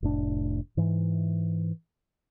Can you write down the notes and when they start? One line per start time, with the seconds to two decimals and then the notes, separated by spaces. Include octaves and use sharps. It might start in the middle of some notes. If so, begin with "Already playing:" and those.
0.03 F1 A2 D4
0.77 G#2 E3